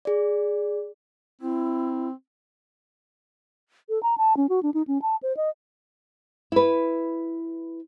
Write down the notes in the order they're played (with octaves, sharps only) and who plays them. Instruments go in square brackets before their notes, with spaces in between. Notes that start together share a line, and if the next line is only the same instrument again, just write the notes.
[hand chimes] G#4 D5
[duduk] C4 [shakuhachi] E4
[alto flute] A4
A#5
A5
C#4
F#4
D4
D#4
C#4
A5
C5
D#5
[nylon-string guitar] E4 B4